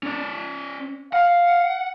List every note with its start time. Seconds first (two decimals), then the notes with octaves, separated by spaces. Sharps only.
0.03 C#4 D5
1.13 F5 F#5